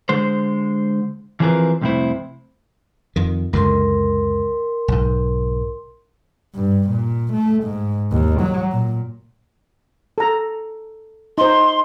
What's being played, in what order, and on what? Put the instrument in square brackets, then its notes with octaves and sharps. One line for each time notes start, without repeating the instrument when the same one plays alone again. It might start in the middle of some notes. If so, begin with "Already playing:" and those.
[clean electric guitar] D3 G#3 C5
E3 F3 C4 G#4 A#4 B4
C2 F2 C3 A3 E4 C5
[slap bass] F2 D#3
[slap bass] C#2 F#2 D3 [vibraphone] A#4 C6
[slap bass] B1 G#2
[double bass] G2
A#2
A3
G#2
D#2
F#3
A#2
[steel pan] A4 A#5
[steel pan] D#4 C5 [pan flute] C6